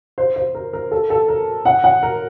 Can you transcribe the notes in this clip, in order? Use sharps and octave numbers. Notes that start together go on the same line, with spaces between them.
C5
C5
A#4
A#4
A4
A4
A#4
F#5
F#5
A#4